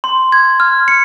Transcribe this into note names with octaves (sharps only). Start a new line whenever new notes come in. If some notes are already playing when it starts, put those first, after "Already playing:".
C6
G#6
F6
C#7